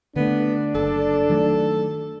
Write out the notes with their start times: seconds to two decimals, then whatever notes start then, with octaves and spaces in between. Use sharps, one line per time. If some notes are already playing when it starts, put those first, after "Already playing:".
0.16 D3 A3 B3 D4
0.75 F#1 A4
1.30 D#3 F#3 A3